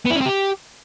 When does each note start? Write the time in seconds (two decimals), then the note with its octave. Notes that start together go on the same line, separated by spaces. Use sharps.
0.06 B3
0.11 E4
0.16 C#4
0.21 C4
0.26 G4